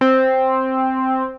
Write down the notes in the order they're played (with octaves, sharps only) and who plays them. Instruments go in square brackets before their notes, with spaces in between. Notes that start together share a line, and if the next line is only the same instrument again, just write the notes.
[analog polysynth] C4